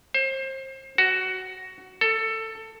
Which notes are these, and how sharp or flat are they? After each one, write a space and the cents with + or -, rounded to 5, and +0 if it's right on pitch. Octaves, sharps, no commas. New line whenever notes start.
C5 +30
F#4 +15
A4 +15